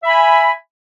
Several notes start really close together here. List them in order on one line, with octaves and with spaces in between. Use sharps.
E5 B5 G#5